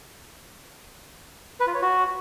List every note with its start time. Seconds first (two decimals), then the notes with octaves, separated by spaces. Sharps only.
1.60 B4
1.67 F4
1.74 C#5
1.81 F#4